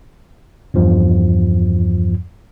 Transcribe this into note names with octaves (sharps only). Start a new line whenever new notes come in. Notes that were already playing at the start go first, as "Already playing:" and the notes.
E2 G2 F3